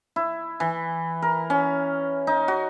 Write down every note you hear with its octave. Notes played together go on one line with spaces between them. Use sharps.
E4
E3
A#4
C#4
D#4
F#4